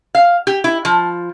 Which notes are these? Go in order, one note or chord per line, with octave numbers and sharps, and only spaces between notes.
F5
G4
E4
F3